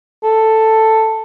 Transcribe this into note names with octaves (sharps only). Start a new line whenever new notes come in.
A4